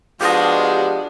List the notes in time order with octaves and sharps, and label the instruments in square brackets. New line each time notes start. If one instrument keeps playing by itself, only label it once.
[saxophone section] F3 G#3 B3 [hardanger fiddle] D4 F#4 [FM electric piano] G4 D#5 [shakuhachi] F5